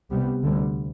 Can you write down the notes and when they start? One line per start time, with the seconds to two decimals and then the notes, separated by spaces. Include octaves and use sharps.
0.11 C2 C3 G3 B3
0.44 D2 D3 G3